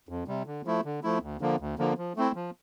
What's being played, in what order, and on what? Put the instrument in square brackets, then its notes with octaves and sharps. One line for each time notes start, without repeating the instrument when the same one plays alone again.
[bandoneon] F2
C3 G3
D3
F3 A3 E4
D3
F3 A3 E4
D2
D3 F3 A#3
D2
D3 F3 A#3
F3
A3 C4 E4
F3